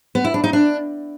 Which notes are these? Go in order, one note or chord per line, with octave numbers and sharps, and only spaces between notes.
B3
E4
D4
D#4
D4